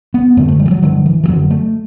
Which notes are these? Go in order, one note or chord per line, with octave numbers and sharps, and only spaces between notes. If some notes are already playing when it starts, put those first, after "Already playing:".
B3
F#2 D3 A3
A3
G3
E3
F#3
G2 D3 F#3
E3
E3
F#2 D3 F#3
A3